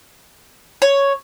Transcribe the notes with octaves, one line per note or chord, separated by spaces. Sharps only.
C#5